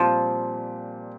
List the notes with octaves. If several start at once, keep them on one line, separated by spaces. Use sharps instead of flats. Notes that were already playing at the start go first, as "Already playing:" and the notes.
Already playing: A#2 F3 G3 C4